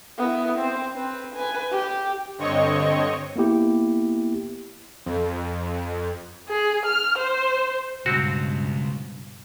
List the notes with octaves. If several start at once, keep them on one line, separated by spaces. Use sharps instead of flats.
B3 E4
C4 C5
C4 B4
B4 G#5
G4
G2 D3 C4 C#5 D#5 C#6
A#3 B3 E4 G4
F2
G#4
F6
C5
C#2 G2 B2 C4 F#4